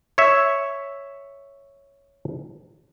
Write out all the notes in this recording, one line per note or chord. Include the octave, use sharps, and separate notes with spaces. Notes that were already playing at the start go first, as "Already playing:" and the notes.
C#5 E5